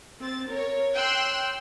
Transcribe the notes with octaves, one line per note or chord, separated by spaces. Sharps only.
C4 A6
A#4 C#5
G5 C6 E6 F#6